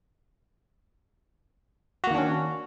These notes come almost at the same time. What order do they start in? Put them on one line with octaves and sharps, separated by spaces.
F#4 A#3 D#3 D4 C#4